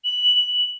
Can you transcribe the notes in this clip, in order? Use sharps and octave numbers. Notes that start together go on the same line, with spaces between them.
F#7